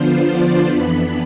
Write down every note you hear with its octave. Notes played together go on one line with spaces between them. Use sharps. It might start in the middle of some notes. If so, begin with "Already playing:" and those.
Already playing: D3 F3 B3 D4 F4 C5
D5
F2 E3 B3 D4 B5